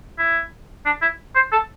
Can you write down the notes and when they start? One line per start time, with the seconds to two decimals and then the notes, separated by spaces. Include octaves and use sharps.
0.19 E4
0.85 D4
1.02 E4
1.36 C5
1.52 A4